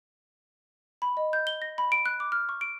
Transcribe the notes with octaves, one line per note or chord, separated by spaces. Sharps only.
B5
D#5
G6
G7
A#6
B5
D7
F#6
D6
F6
C#6
D7